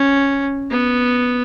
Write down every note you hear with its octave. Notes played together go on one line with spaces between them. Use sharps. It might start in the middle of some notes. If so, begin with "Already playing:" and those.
Already playing: C#4
B3